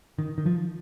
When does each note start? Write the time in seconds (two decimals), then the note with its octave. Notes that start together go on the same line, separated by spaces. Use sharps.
0.19 D#3
0.38 D#3
0.46 F3